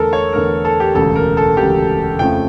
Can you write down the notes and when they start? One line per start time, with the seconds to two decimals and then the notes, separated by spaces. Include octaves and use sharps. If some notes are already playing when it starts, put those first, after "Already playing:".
Already playing: E2 D3 A3 A4 A#4
0.13 C#5
0.33 E2 D3 A3 A#4
0.65 A4
0.80 G4
0.95 E1 D2 C#3 A4
1.16 A#4
1.37 A4
1.57 E1 D2 C#3 G4
2.19 F2 C#3 F3 A3 G5